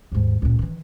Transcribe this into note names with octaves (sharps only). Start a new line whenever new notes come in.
D#2 G#2
C#2 A#2
D#3 E3